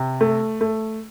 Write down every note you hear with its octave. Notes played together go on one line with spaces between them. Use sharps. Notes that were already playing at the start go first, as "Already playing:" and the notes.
Already playing: C3
A3
A3